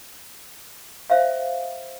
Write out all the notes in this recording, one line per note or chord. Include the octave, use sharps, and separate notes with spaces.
C5 E5 F5